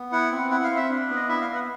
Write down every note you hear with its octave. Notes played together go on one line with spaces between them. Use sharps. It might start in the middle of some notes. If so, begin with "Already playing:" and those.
Already playing: B3
E4 F#5
C4
E4 F#5
F5
C4
E5
D4
B3
D#5
E4 E5
F5
B3
F#5